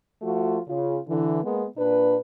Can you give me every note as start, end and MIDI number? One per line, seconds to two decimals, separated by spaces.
0.22 0.59 53
0.22 0.59 57
0.22 0.59 65
0.22 0.59 66
0.68 0.98 49
0.68 0.98 65
1.08 1.42 50
1.08 1.42 52
1.44 1.64 56
1.44 1.64 58
1.44 1.64 59
1.78 2.17 46
1.78 2.17 62
1.78 2.17 71